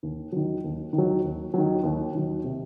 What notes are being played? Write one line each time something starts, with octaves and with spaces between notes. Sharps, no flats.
D#2
D#3 F#3
D#2
D#3
F#3
D#2
D#3 F#3
D#2
D#3 F#3
C3